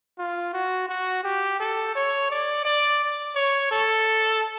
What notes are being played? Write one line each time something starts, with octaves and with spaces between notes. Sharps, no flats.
F4
F#4
F#4
G4
A4
C#5
D5
D5
C#5
A4